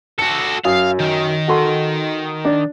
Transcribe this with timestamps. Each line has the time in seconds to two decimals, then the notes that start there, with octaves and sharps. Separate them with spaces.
0.19 F#4 A4 C#7
0.65 F#2 F5 D#6
1.00 D#3
1.48 F#4 A4 C6
2.45 D4